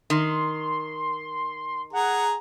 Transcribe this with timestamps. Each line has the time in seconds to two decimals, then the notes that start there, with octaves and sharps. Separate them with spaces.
0.10 D#3 C6
1.93 G#4 F#5 A#5